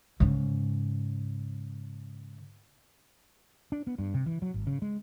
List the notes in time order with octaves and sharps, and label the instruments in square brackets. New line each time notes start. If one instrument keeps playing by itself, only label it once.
[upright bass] G#2 C#3
[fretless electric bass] D4
B3
G2
C3
E3
F#3
G#1
C#3
G#3